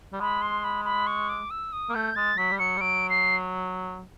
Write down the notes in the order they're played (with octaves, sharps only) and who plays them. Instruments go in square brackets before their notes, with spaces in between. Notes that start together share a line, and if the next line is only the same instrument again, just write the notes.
[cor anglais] G3
[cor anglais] G#3 [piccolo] B5
[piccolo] C6
B5
B5
C#6
D6
E6
D#6
[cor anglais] A#3
[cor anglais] A3 [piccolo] G6
[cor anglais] G#3 [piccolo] A6
[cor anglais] F#3 [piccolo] B6
[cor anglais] G3
[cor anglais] F#3 [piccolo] C#7
[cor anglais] G3
[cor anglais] F#3 [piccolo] D7
[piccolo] C7